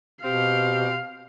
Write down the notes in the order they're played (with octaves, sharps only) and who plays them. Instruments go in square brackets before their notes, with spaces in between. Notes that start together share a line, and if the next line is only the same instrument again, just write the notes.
[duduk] B2 [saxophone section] C4 G4 [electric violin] F5